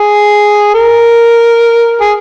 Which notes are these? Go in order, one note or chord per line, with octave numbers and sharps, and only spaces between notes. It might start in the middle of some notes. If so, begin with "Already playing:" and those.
Already playing: G#4
A#4
G#4